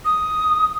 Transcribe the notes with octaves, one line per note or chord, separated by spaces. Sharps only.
D#6